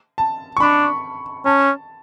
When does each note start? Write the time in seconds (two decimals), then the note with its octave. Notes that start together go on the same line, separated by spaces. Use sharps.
0.18 A5
0.57 C#6
0.60 D4 B5
1.45 C#4 A5